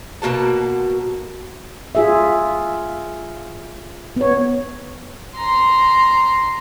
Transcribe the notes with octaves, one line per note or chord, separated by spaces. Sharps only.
B2 A#3 F#4 A5
F4 G#4 E5
B3 C#5
A#5 C6